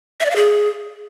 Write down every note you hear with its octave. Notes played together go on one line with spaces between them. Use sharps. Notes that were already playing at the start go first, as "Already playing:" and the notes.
E5
D5
F5
G#4